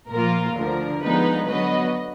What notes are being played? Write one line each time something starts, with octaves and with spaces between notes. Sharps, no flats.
A#2 F3 A#3 F4 A#4
D2 D3 F3 A#4
D3 F3 G#3 B3 D#4 B4
D3 F#3 B3 B4 D#5